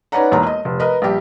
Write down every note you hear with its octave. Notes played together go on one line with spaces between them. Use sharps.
C#4 D#4 B4 D5 F#5 A#5
E1 E2 A#3 A#5
D#5
F1
A#4 B4 D#5
A#1 G3 G4